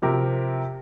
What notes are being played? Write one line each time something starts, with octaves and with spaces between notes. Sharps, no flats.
C3 F3 C4 G4 A#4